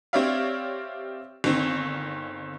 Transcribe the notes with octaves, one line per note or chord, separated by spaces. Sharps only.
C4 G4 C#5 D5 E5 F5
G1 D#3 C4